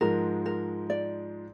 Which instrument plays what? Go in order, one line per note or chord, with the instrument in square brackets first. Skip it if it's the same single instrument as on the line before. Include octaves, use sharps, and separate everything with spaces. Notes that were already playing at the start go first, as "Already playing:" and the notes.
[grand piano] G#2 F3 G#3 [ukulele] A#4
[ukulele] A#4
D5